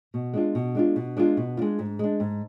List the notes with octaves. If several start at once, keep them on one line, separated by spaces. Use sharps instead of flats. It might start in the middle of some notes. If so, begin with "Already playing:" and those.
B2
G#3 D4 F4
B2
G#3 D4 F4
B2
G#3 D4 F4
B2
G#3 D4 F4
G#2
G#3 D4
G#2